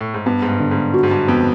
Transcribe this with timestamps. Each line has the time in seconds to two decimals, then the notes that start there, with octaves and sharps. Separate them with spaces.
0.01 A2
0.14 G#2
0.26 G2 B3
0.42 G#2
0.49 G2
0.59 D3
0.71 G#2
0.94 F#4
1.03 G#2
1.11 G2
1.28 F2 B3